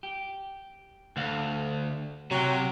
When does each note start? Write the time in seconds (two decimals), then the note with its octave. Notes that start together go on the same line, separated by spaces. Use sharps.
0.03 G4
1.17 D2 A4 F5 F#5
2.31 C3 F#3 C#5 F#5 G5